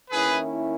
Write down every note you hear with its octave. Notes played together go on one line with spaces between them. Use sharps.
D#3 A#3 C#4 E4 G#4 B4